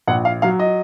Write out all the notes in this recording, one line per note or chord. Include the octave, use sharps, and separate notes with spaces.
A#1 F#5
F5
F#3 F5
D#5